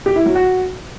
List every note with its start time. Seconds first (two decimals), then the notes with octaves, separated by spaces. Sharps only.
0.06 G4
0.16 E4
0.26 F#3
0.35 F#4